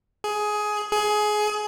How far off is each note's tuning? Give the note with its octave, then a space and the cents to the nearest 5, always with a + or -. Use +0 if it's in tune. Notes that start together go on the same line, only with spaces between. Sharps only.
G#4 +15
G#4 +20